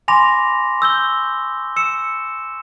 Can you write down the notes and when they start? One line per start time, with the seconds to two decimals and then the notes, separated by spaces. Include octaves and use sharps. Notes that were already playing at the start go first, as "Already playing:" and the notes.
0.08 G#5 B5 C6 D6 A#6 F7
0.80 C#6 E6 G6 G7
1.76 E6 C#7 E7